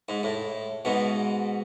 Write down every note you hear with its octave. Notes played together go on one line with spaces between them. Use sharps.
G#2
A2
G#2 B2